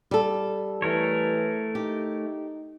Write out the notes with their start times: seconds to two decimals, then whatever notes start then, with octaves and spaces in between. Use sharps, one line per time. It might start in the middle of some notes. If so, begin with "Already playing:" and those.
0.11 G3 A4
0.82 E3 A3 A#4 C#5
1.75 D#4 G4